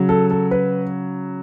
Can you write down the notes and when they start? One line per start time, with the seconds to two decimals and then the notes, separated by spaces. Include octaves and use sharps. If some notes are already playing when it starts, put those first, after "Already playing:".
Already playing: C#3 F#3
0.09 A4
0.30 A4
0.51 B4